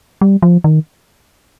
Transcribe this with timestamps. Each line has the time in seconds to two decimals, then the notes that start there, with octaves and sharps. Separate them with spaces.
0.21 G3
0.42 F3
0.64 D#3